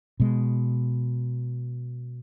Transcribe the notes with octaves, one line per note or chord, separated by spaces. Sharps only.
B2 G#3